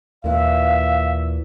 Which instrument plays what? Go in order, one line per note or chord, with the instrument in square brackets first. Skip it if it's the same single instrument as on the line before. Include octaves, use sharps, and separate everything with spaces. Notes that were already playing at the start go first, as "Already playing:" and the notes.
[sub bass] D#2 [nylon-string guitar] A#2 E3 [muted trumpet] E5 [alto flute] F5